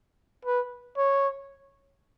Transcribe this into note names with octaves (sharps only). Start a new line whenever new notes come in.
B4
C#5